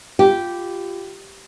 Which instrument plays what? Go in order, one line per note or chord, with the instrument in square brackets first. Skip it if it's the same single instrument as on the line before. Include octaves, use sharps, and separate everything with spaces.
[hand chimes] F4 [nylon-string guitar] G4